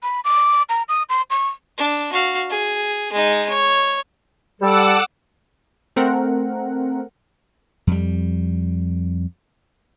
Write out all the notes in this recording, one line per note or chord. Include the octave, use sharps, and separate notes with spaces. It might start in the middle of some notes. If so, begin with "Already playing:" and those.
B5
D6
A#5
D#6
C6
C#6
D4
F#4 F5
G#4
G#3 D#4
C#5
G3 A4 F#5 D6 E6
A3 C4 A#4 F#5
F2 G3